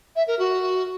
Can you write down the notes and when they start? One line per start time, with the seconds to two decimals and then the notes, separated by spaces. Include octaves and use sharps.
0.16 E5
0.27 A#4
0.39 F#4